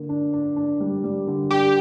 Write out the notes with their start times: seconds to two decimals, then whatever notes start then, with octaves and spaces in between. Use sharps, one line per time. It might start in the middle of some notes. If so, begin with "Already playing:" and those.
Already playing: D3 A#3
0.09 D4
0.33 D4
0.56 D4
0.80 G3
1.04 G3
1.27 D3
1.51 D4 G4